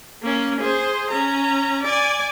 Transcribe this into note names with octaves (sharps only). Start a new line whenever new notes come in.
A#3 C#4
G#4 C5
C#4 A#5
D5 G#5